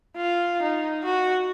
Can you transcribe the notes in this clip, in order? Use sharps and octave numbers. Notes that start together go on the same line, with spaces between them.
F4
D#4
F#4